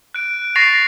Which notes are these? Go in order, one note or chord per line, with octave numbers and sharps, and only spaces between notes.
F#6 D7
C#6 A6 A#6 C7 F7